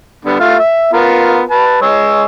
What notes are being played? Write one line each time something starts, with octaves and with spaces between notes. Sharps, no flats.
D3 G3 B3
A3 F4 F5
E5
B3 F4 A#4
B4 A5
G#3 C#5 E6